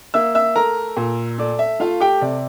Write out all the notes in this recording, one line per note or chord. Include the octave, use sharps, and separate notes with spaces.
A#3 E5 E6
E5 E6
A3 A#4 A#5
A#2
A3 D5
E5
A3 F4 F5
G4 G5
C3 D5